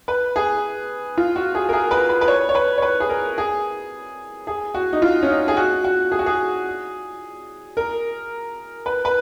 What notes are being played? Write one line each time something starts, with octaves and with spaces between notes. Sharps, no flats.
B4
G#4
F4
F#4
G#4
A#4
G#4
B4
B4
B4
C#5
C#5
B4
C#5
B4
G#4
A#4
G#4
G#4
F#4
D#4
F4
C#4
D#4
G#4
F#4
F#4
G#4
F#4
G#4
A#4
B4
B4